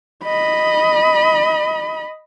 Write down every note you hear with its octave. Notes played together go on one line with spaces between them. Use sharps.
D#5 B5